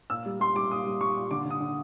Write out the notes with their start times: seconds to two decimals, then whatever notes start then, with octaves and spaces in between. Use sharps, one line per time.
0.10 A#2 E6
0.26 G3
0.40 G3 C6
0.56 G3 D6
0.71 A#2 D#6
0.86 G3
1.01 G3 C#6
1.16 A#2
1.31 D3 D6
1.45 D3 D#6
1.60 D3